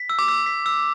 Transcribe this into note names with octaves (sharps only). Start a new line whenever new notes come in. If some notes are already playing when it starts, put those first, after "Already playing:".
Already playing: B6
E6
D6
E6
B6
E6